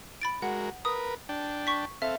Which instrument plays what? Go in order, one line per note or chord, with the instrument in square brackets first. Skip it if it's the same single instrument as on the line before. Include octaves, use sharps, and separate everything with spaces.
[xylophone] B5 A6 D7
[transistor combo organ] G#3 F#4 A#4 [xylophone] F#5
[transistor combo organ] A#4 B4 [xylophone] D#6
[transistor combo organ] D4 G5 A5
[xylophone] C#6 B6
[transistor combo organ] C4 A4 F5 [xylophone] E5